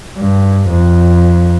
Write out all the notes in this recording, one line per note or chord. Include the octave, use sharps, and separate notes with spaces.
G2
F2